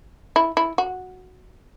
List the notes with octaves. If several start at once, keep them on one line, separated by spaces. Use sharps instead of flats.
E4
E4
F#4